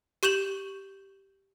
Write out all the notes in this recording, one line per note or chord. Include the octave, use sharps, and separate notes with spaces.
G4 C#6 G6 E7 F#7